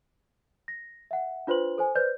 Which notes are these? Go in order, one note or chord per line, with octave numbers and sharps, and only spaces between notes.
A#6
E5 F#5
D4 F4 B4 C5 C6 F#7
A4 C5 G#5
B4 C5 D5 G6